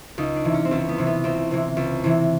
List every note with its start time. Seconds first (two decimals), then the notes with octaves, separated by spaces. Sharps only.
0.18 C#2 D#4
0.36 D4
0.45 C3 E3
0.54 C#4
0.65 C4
0.71 C#2 C#4
0.89 B3
0.98 C3 E3
1.07 B3
1.24 C#2 C4
1.51 C3 E3
1.77 C#2
2.04 C3 E3